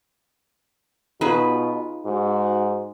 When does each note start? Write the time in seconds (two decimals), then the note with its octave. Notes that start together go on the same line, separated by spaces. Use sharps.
1.21 B2 D#4 F4 G#4 B4
2.05 G#2 F#4